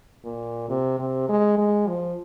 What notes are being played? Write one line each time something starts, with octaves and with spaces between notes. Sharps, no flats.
A#2
C3
C3
G#3
G#3
F3